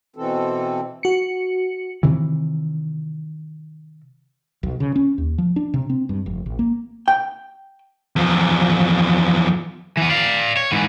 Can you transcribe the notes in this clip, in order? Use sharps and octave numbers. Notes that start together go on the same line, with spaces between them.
B2 E3 C4 A4
F#4 C#7
C3 D#3 E3
B1
C#3
C#4
D#2
F3
D4
C3
C4
G2
F1
A1
A#3
G5
E2 F3
E3 B3
D5 F5
C#5
G#2 E3